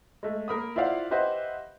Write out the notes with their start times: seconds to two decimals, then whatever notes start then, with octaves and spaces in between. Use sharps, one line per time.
0.23 G#3 A3
0.48 A#3 A#4 B5 D#6
0.76 E4 F4 C5 D5 F5 F#5
1.11 G4 B4 C5 D#5 E5 F#5